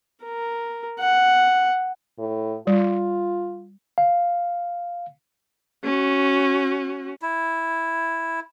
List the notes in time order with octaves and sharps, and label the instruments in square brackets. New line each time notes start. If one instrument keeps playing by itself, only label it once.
[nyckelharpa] A#4
F#5
[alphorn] A2
[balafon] G3 [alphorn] F4
[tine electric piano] F5
[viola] C#4 F#4
[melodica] E4